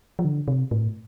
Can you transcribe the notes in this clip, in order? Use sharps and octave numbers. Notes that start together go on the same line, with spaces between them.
F3
D3
C3
A2